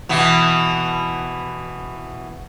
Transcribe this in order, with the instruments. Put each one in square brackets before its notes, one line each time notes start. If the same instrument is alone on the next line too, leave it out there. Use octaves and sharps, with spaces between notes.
[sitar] B2 E3 B3